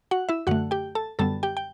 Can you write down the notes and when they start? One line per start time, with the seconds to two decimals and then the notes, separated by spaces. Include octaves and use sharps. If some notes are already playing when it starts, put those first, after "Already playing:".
0.11 F#4 F#5
0.29 E4 E5
0.47 F#2 D3 A3 F#4 F#5
0.71 G4 G5
0.95 A4 A5
1.19 F#2 D3 G3 B3 A4 A5
1.43 G4 G5
1.57 G5